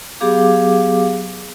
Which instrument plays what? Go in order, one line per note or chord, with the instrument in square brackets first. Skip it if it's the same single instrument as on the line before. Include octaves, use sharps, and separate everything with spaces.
[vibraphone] F#3 B3 G4 G#4 F5 D6